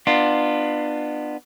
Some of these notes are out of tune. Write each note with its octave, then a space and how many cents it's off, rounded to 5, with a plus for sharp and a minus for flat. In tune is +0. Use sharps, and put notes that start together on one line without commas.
B3 +0 D4 +35 F4 +0